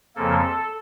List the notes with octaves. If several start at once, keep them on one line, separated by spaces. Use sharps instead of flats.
F2 C#3 F3 A#3 A4